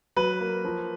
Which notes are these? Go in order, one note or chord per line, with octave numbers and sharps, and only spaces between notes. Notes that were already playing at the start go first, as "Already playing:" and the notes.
F#3 B4
A#3
F3